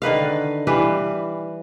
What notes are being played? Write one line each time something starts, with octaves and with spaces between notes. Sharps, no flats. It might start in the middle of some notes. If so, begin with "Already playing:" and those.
D3 D#3 B4 F5
E3 G3 B4 F5